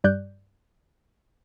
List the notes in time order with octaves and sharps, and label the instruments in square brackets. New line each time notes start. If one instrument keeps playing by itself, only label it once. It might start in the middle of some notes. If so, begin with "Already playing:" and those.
[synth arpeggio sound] G2 G3 D5 F#6 G6